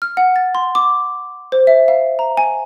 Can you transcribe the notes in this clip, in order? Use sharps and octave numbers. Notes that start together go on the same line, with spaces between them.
F6
F#5
A6
C6
D6
C5
E5
F5
A#5
G#5